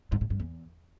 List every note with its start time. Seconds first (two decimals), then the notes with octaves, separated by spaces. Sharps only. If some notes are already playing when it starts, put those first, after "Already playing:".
0.12 G#2
0.21 A2
0.30 G2
0.40 E2